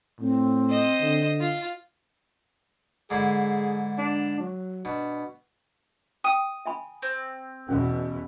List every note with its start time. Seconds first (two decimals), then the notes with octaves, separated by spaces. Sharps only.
0.21 A2 C4
0.70 C5 D#5
1.01 D3
1.41 F4
3.10 G#2 D3 E4 G#4
3.98 D4
4.39 F#3
4.85 B2 D4
6.24 G5 D#6
6.66 E5 G#5 B5
7.02 C4
7.69 E2 B2 C#4